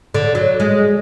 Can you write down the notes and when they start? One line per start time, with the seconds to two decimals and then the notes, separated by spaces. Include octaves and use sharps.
0.14 D3
0.35 F#3
0.60 G#3